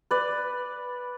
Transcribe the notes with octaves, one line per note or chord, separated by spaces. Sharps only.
B4 D5